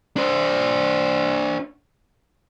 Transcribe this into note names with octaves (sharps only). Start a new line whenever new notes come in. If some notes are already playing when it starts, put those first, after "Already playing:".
D4 C5